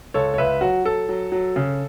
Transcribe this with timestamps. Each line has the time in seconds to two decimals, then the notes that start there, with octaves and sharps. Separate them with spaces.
0.14 C#2 A4 C#5
0.34 C#5
0.38 C#2 B4 E5
0.61 F#3 F#4
0.85 F#3 A4
1.09 F#3
1.32 F#3
1.56 C#3